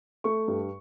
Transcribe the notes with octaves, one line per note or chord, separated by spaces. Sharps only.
A3 C#6
G2